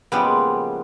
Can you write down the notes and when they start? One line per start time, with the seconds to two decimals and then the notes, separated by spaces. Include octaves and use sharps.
0.12 A#2 C#3 F3 G3 G#3 B3